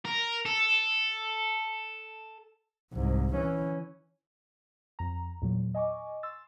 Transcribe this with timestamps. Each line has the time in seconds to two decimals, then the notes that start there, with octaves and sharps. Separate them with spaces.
0.05 A#4
0.46 A4
2.93 C2 G#2
3.33 E3 C#4
4.99 F2 A#5
5.42 E2 A#2 F#3
5.75 D#5 G#5 C#6 D6
6.23 C6 E6 A6